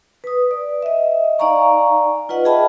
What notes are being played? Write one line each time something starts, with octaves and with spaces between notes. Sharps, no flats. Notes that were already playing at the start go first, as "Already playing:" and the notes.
B4 D#6
D5
D#5 E5
D#4 D5 F5 G#5 A#5 C#6
F4 B4 D#5 F#5
G#4 D#5 E5 G5 A5 B5